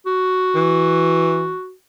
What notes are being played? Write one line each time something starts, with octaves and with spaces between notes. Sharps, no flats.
F#4
E3